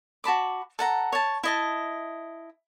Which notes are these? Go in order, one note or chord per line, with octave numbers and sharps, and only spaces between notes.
F#4 A5 B5 D6
A4 F#5 A#5
C#5 A5
E4 D#5 A5